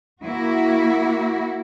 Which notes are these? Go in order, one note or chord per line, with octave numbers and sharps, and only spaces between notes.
A#3 E4 F#4